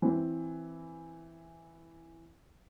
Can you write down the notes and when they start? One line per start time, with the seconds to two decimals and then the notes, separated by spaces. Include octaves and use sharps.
0.02 E3 C4